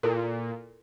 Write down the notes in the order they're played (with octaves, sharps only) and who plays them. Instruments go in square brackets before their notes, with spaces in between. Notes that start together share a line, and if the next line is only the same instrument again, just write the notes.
[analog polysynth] A#2 [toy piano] E4 A4 A#4